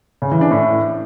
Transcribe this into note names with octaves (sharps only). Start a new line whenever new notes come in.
C#3
E3
D4
A2